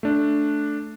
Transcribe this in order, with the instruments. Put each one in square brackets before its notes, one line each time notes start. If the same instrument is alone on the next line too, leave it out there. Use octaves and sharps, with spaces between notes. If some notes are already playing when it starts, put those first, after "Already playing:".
[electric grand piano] A3 D4